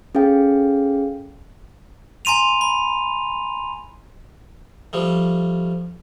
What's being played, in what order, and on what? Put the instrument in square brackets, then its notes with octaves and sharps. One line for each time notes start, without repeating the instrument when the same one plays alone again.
[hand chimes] C#4 G#4 A4 F5 G5
[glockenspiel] G#5 A#5 C6 D#7 F7
B5
[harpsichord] F3 G3 A3